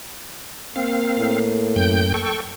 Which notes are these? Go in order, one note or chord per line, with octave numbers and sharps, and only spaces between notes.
A#3 C4 F5
A2
F#2 G5 G6
A4 G5 C#6